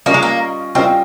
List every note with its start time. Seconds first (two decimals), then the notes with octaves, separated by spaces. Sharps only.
0.06 G3 A#3 C#4 F4 A#4 D#5
0.14 G#3
0.23 A#3
0.75 G3 C4 C#4 F4 A#4 D#5